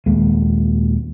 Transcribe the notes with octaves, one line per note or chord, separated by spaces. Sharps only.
D#1 D#2 G#3 A#3